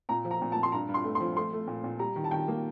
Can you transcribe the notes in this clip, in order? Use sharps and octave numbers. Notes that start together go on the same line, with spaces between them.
A#2 A#5
F3
A#5
A#2
A5
A#2
C6
G2 A#5
G2
C6
A3
C6
F3
A3 C6
A3
A#2
A#2
G3 A#5
D#3
A5
D#3 G5
A#3